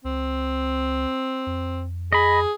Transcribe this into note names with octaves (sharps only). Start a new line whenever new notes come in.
C#2 C4
F2
G#4 D#5 B5